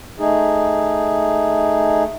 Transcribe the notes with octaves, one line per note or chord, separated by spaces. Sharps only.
A3 D#4 G#4